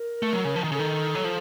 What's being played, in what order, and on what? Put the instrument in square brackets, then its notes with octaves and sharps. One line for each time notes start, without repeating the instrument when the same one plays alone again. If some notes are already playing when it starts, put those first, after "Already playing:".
Already playing: [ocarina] A#4
[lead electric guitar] A3
F#3
C#3
F3
D#3
[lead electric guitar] C#3 [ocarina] A4
[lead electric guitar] D#3
F#3
F3